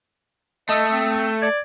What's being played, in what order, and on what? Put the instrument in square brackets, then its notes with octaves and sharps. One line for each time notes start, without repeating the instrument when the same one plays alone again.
[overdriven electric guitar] A3 [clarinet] D#5 [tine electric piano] A5 D#6 E6
[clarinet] C4
[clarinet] D5 [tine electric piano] G#6